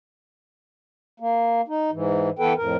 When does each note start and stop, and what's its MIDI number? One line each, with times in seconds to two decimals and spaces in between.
1.20 1.61 58
1.68 1.91 63
1.92 2.30 44
1.92 2.30 52
2.39 2.53 52
2.39 2.53 59
2.39 2.53 69
2.39 2.53 71
2.39 2.53 79
2.57 2.77 41
2.57 2.77 45
2.57 2.77 70